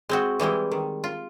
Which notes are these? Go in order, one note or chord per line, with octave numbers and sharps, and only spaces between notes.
G#3 C4 F#4
E3 G3 G#3 E4
D#3
F4